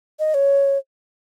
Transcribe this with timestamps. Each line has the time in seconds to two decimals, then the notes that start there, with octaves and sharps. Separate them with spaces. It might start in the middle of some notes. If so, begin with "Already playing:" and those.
0.19 D#5
0.34 C#5